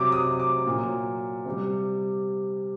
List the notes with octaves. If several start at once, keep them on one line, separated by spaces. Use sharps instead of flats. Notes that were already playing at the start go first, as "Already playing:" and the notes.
Already playing: C3 F#3 D6
D#6
D6
A#2 F#3
C3 G3